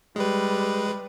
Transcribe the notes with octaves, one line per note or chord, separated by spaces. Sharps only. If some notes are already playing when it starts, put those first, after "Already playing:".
G3 G#3 B4